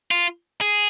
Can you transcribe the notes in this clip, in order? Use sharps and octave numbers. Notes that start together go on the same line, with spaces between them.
F4
G#4